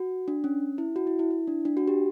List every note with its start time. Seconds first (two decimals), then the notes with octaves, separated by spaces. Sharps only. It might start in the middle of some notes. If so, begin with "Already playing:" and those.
Already playing: F#4
0.28 D4
0.44 C#4
0.78 E4
0.96 F#4
1.07 E4
1.19 E4
1.31 E4
1.47 D4
1.65 D4
1.77 F#4
1.88 G4